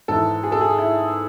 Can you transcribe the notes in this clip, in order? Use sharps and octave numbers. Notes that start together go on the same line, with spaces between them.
G#2 E3 A4
G#4
A4
G#4
E4